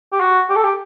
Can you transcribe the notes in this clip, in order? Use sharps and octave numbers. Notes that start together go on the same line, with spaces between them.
G4
F#4
G4
A4
G4